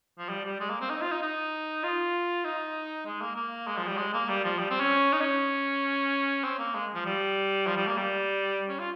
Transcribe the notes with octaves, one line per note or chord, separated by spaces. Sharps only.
F3
G3
G3
G#3
A#3
C4
D#4
F4
D#4
D#4
F4
D#4
G#3
A#3
A#3
G#3
F3
G3
G#3
A#3
G3
F3
G3
C4
C#4
D#4
C#4
C4
A#3
G#3
F3
G3
F3
G3
A#3
G3
C#4
F4